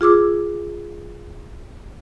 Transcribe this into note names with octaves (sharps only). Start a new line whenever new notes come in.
F4 G#4 D6 E6